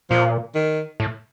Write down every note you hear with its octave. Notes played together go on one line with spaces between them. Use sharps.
A#2 F3
D#3
A2